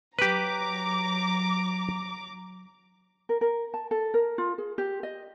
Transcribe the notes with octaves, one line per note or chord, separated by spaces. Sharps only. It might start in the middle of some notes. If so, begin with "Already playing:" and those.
F#3 G4 B4 A#5 D6
A#4
A#4
A5
A4
A#4
F4
G#4
G4
D#5